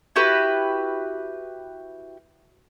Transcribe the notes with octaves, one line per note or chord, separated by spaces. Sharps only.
E4 F#4 G4 B4